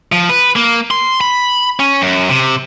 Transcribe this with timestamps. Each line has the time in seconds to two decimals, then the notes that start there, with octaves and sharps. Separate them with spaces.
0.12 F3
0.29 B4
0.56 A#3
0.91 C6
1.21 B5
1.80 C#4
2.02 F#2
2.29 C3